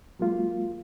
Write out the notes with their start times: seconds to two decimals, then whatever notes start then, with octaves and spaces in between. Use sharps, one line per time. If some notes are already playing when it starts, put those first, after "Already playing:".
0.20 F#3 G#3 A#3 F4